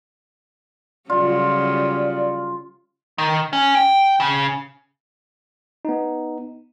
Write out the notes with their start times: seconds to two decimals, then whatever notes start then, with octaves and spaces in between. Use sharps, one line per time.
1.10 C#3 F#3 G3 F4 D5
3.18 D#3
3.53 C#4
3.75 G5
4.20 C#3
5.85 B3 D#4